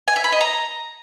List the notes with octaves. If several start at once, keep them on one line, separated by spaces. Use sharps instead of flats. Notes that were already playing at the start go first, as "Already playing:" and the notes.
G#5
E5
B5
D#5
A#5